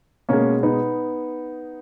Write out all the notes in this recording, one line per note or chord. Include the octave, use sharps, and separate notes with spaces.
B2 G#3 A#3 C#4
B3 D#4